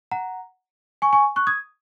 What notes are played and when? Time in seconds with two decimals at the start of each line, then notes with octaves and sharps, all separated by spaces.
0.11 F#5 A#5
1.02 G#5 C#6
1.13 G#5 C#6
1.36 C#6 F#6
1.47 D#6 G#6